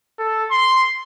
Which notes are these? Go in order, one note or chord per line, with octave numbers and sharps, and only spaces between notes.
A4
C6